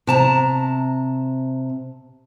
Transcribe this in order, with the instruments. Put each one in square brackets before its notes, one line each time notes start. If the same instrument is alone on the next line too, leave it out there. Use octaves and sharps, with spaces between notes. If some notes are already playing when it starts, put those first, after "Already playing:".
[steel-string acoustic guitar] C3 A5 A#5